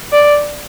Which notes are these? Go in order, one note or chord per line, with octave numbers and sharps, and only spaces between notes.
D5